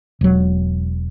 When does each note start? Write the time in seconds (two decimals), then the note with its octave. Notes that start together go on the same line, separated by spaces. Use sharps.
0.21 E1 F#3